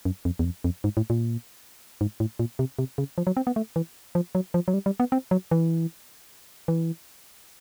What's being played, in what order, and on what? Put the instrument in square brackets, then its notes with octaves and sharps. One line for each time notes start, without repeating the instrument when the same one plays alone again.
[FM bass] F#2
F2
E2
F2
F2
G#2
A2
A#2
G#2
A2
A#2
C3
C3
C#3
F3
F#3
C4
B3
A3
E3
F3
F#3
F3
F#3
G3
G3
B3
C4
F#3
E3
E3